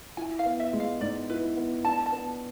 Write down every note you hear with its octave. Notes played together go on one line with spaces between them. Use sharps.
E4 G#5
F5
B3
E5
G#3
F5
G#2 D5
E4 B4
B3
D4 A5
A5
B3